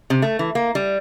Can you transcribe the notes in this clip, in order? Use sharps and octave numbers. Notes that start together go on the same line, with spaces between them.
C3
A3
E3
A#3
G3